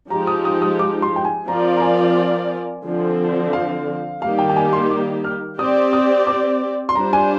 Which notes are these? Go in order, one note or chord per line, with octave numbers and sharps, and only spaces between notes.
F3 G#3 D#4 G4 A#5
D#6
D#6
D#6
D6
C6
G5
G#5
F3 C4 F4 A#4 D5 A#5
A#5
G#5
D3 F3 C4
F5
D#3 G3 A#3 D#4 G4 F5
G5
G5
G#5
C6
D6
F6
C4 G4 D5 D#6
D#6
D6
C6
G3 D4 F4 C5 A#5
G#5